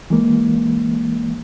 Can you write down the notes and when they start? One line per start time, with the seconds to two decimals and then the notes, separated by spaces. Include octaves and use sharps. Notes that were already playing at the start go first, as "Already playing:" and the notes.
0.10 E3 G#3 A#3